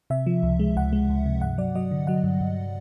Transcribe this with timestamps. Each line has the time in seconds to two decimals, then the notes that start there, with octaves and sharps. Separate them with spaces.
0.10 C3 E5
0.26 F3
0.43 C#2
0.59 G#3
0.76 C#2 F#5
0.93 G#3
1.09 C#2
1.26 C3
1.42 G2 F#5
1.58 F#3 D5
1.75 F#3 D#5
1.91 D3
2.07 F#3 F#5
2.24 G2
2.41 G2